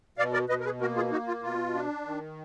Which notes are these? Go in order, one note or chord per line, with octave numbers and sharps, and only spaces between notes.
B2 D5 F5
A#4 D5
B2 B4 D#5
A#4
G#4 B4
A#3 F#4 A#4
F4 G#4
D#4 F#4
F4
B2 F4
D4
D#3